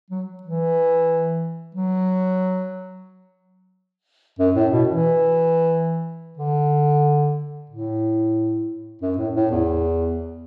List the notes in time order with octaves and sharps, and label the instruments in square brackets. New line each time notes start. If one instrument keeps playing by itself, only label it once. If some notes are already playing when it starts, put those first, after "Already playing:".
[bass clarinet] F#3
E3
F#3
F#2
A2
B2
E3
D3
A2
F#2
A2
A2
E2